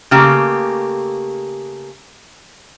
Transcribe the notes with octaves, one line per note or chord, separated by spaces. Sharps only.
C#3 A3 A#3 G4